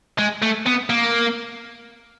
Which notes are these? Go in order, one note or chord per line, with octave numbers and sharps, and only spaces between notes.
G#3
A3
B3
A#3